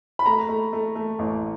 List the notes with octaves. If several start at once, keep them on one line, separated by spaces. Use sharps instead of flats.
B5
A3 A#5
A3
A3
A3
A1